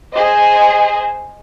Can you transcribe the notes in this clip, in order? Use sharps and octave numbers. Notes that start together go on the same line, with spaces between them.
G#4 C5 D#5